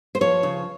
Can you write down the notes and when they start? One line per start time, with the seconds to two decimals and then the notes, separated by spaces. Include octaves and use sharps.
0.15 C5
0.21 F3 C#5
0.43 C#3